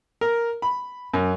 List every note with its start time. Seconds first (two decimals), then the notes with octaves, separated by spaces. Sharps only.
0.21 A#4
0.62 B5
1.13 F#2